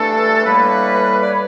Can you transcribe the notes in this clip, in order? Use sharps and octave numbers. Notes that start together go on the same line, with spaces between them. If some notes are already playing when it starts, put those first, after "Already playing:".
Already playing: G2 E3 A3 D4 A4
A2 E3 G3 A#3 B4
D5
C#5